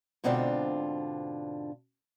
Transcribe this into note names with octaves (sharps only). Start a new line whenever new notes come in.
G#2 B2 D3 C4 D4 F4